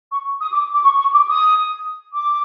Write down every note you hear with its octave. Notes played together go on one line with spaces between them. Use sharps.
C#6
D#6
D6
D6
C#6
C#6
D6
D#6
D6